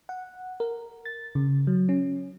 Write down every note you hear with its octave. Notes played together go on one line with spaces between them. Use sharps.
F#5
A#4
A6
C#3
F#3
C#4